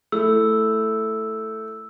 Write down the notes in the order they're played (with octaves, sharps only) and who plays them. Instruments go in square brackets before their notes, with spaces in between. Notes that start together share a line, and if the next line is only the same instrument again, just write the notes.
[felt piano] A3 E4 [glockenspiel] E6